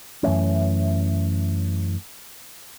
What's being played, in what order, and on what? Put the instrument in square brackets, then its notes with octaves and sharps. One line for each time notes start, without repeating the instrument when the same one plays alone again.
[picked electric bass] F#2 E3 A3 C#4